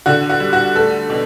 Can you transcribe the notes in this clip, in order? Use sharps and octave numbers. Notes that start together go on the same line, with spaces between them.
D3 F#4
F#4
G3
F#4
A3 A4
B2